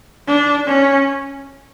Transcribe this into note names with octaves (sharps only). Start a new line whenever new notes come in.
D4
C#4